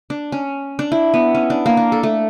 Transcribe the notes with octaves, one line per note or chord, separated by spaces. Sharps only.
D4
C#4
D4
E4
B3
C#4
D4
A#3
D4
A4
A3